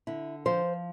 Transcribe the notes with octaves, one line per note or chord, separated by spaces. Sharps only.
D3 E4
F3 C5